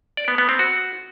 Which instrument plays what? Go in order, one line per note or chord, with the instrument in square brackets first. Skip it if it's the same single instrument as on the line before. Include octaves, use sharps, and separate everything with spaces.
[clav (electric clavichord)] D5
B3
B3
C4
F#4